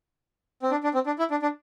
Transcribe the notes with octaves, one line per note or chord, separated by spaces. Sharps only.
C4
D4
D4
C4
D4
E4
D4
D4